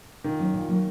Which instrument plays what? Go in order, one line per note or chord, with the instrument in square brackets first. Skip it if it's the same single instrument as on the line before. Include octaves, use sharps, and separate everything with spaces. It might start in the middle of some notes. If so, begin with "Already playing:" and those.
[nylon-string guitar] A#2 [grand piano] D#3
[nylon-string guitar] F#3 A#3 C#4
A#2
F#3 A#3 C#4